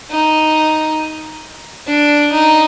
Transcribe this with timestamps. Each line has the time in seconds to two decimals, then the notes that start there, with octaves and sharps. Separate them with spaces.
0.10 D#4
1.87 D4
2.32 D#4